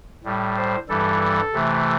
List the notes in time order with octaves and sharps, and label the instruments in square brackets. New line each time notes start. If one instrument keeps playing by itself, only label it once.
[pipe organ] A2 G3
C5
G2 E3 G3 A4
C3 E3 A3